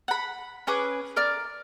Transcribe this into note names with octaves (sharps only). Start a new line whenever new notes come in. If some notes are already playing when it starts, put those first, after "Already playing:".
F#5 B5
C#4 G#4 B4 D6
A#4 D5 F6